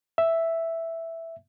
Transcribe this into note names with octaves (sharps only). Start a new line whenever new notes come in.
E5